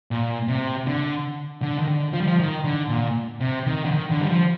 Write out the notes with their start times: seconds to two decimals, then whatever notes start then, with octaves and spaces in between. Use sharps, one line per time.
0.11 A#2
0.48 C3
0.87 D3
1.62 D3
1.79 D#3
1.88 D3
2.13 F3
2.21 G3
2.28 F3
2.39 D#3
2.64 D3
2.89 A#2
3.40 C3
3.66 D#3
3.85 D3
3.91 D#3
4.11 D3
4.21 G3
4.29 F3